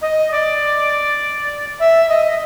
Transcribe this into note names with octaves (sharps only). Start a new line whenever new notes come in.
D#5
D5
E5
D#5